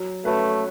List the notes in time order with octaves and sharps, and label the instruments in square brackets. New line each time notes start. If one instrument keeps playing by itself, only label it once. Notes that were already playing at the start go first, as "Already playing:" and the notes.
Already playing: [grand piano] F#3
[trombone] A3 [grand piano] C#4 F#4 B4